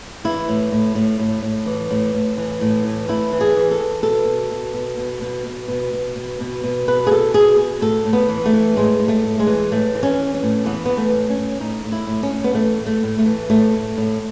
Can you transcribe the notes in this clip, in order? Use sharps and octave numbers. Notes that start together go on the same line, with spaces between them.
E3 E4
A2
A2
A2
A2
A2
E3
A2
A2
E3
A2
E3
A2 E4
E3
G#4
E3
A4
E3
B2 A4
B2
B2
B2
B2
B2
B2
B2
B2
B2
B2
B2
B2 B4
G#4
B2 A4
B2 G#4
B2
A2 A4
A2
B3
E3
A3
E3
A2 G#3
A2
A3
A2
G#3
E3
A2 A3
E3
C#4
E3
C#4
A2
E3 B3
E3 B3
A3
A2
C#4
A2
A2 D#4
A2
E4
A2
C#4
A2
B3
E3 A3
A2
A3
A2
A3
E3
A2 A3
A2
A2